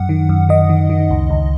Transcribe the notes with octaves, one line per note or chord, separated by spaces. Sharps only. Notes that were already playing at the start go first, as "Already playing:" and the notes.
Already playing: F#2 F#5
D#3
F#2
D#3 D#5
D#3
D#3
C#2
C#2